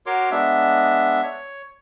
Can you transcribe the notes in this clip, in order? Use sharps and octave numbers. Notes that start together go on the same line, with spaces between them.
F#4 A#4 C#5 C6 D6
G#3 B3 D4 E5
C#5